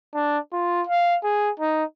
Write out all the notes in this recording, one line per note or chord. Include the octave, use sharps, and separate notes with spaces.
D4
F4
F5
G#4
D#4